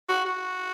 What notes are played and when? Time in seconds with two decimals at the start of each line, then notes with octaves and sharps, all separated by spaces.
0.09 F#4
0.25 F#4